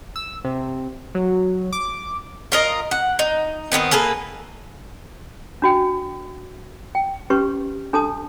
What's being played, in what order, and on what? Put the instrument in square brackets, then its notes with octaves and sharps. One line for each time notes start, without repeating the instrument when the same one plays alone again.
[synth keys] E6
C3
F#3
D6
[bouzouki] F4 A#4 D#5
F#5
D#4
D#3 G3 B3 C4
A#3 G#4 A4 B4
[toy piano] D4 F#4 G5
G5
C#4 G4 B4 C#6
D4 A4 A5 D#6